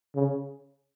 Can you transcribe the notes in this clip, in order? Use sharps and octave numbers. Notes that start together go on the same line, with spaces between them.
C#3